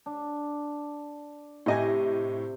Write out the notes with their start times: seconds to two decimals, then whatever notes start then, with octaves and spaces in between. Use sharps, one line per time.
0.06 D4
1.66 A2 C3 G4 D#5 G#5